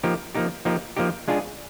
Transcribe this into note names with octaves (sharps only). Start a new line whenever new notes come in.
F3 A#3 D#4 G4
F3 A#3 D#4 G4
F3 A#3 D#4 G4
F3 A#3 D#4 G4
G#3 D4 F4 G#4